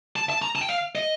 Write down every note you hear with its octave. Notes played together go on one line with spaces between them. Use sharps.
A5
A5
A#5
A5
G5
F5
D#5